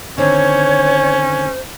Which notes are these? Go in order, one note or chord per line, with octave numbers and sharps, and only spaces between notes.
D3 D#3 C4 C#4 C5 C#5